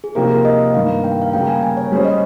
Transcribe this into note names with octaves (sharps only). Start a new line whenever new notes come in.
G#4
C3 F3 A#3 D#4 G4 A#4
D#5
G2 D#3 A#3 F5
G5
F5
C#3 G3 A#3 G5
G#5
G#5
C#5
G3 C#4 G#4 C5 C#5
D#5